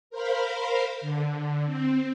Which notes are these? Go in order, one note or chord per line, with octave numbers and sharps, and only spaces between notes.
A#4 C5 F5 B5
D3
C4